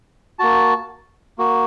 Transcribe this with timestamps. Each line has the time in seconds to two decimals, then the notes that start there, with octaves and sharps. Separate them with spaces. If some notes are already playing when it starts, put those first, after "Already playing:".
0.39 A#3 F#4 A5
1.38 A#3 F#4